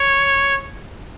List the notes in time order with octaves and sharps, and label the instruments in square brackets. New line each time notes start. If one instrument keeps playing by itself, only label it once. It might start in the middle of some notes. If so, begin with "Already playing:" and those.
Already playing: [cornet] C#5